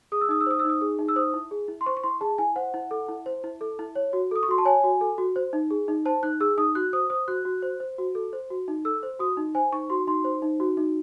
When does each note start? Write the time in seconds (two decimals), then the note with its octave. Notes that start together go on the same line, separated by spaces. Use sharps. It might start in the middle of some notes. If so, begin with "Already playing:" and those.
0.12 G#4 D#6
0.21 E6
0.29 D#4 D#6
0.41 E6
0.46 C5 D#6
0.59 E6
0.64 D#4 D#6
0.81 G#4
0.99 D#4
1.08 E6
1.16 C5 D#6
1.34 E4
1.51 G#4
1.68 E4
1.81 C6
1.86 C5 C#6
1.97 C#6
2.04 E4 C6
2.21 G#4 A5
2.38 E4 G#5
2.56 C5 F#5
2.74 E4
2.91 A4
3.09 E4
3.26 C5
3.44 E4
3.61 A4
3.79 E4
3.95 C#5
4.13 F#4
4.31 A4 D#6
4.43 C#6
4.48 F#4 C6
4.58 A5
4.65 C#5 G#5
4.84 F#4
5.01 A4
5.18 F#4
5.36 C5
5.53 D#4
5.71 G#4
5.88 D#4
6.05 C5 A5
6.23 D#4 F#6
6.40 G#4 E6
6.58 D#4 D#6
6.75 F#4 F#6
6.93 C5 D#6
7.10 C5 D#6
7.28 F#4 F#6
7.45 F#4
7.63 C5
7.80 C5
7.98 F#4
8.15 A4
8.33 C5
8.50 F#4
8.68 D#4
8.85 A4 E6
9.03 C5
9.19 F#4 D#6
9.37 D#4
9.55 C5 G#5
9.73 D#4 C#6
9.90 F#4 C6
10.07 D#4 C6
10.24 C5
10.42 D#4
10.60 F#4
10.77 D#4